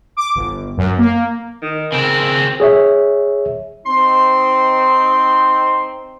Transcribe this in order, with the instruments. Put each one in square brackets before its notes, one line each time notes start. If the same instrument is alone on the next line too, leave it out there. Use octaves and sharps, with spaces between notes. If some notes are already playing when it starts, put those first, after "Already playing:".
[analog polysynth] D6
G1
F#2
A#3
[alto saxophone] D#3
[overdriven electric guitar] C#3 C4 [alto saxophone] A#4
[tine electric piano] G#4 C#5 E5
[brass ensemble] C4 D#4 [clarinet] C6